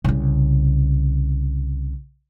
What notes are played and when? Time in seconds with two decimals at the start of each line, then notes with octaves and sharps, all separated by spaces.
0.04 C2 C#3